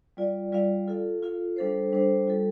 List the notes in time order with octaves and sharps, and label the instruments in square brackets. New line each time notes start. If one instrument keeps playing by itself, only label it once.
[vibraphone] G3 F4 D5 F5
G3 F4 D5 F5
F4 A4 F5
F4 A4 F5
G3 D4 A4 C5
G3 D4 A4 C5
G3 F4 A4